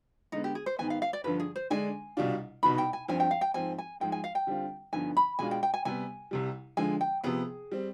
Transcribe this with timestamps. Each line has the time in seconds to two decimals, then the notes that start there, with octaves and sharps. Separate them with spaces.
0.32 D3 G#3 B3 D#4
0.44 G4
0.55 G#4
0.66 C5
0.79 G#2 D#3 B3 G#5
0.90 F5
1.02 F5
1.13 D5
1.24 G2 D3 F3 B4
1.40 G#4
1.56 C5
1.70 D3 G#3 D4 G#5
2.17 C2 B2 G3 D4 F4
2.63 C2 B2 B3 D#4 B5
2.78 G5
2.93 G#5
3.08 G2 F3 C4 G#5
3.20 G5
3.31 F5
3.41 G5
3.54 G#2 F3 C4 G#5
3.78 G#5
4.00 G#2 F3 G#3 G5
4.12 G#5
4.24 F5
4.35 G5
4.47 D3 G3 C4 F4
4.93 G2 D3 F3 B3 D#4 G#5
5.17 B5
5.39 B2 G#3 D4 F4 G#5
5.51 G5
5.63 G5
5.74 G#5
5.85 C3 G3 B3 G#5
6.31 C2 C3 G3
6.77 D3 F3 G#3 G#5
7.01 G5
7.24 C3 F3 B3 G#4
7.72 G3 C4